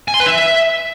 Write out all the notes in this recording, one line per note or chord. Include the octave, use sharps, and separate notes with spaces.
G#5
C6
B4
E5